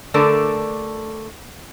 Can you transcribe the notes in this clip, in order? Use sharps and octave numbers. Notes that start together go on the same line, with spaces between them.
D3 A3 A4 A#4 D5